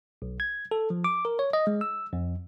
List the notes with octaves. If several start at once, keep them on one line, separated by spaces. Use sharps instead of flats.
B1
G#6
A4
F3
D6
A#4
C#5
D#5
G#3
E6
F2